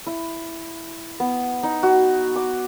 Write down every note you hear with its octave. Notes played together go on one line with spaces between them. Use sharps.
E4
B3
D#4
F#4
D6